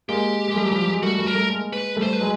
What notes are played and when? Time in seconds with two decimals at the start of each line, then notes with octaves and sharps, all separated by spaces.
0.09 G#3 A#3 G4
0.48 G#3
0.56 G3 A3
0.65 F#3
0.72 F3 G3
0.83 G3
0.88 F#3 G#3
1.03 G3 A3 F#4
1.18 G3 A3
1.27 A#4
1.34 G3 A3
1.50 G#3 A#3
1.73 B4
1.96 G3 A3
2.02 C5
2.13 B4
2.21 F#3 G#3